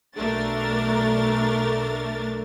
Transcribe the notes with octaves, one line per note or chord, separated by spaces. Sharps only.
B1 A3 D4 A#4 A6